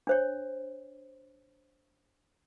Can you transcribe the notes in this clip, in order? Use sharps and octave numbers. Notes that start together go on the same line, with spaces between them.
D4 C5 C#5